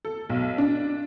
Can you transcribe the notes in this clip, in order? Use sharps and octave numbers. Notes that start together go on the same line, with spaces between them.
A4
B1
D4